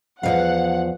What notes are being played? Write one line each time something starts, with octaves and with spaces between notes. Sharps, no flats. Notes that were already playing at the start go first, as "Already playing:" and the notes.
E2 D#3 F3 F5 F#5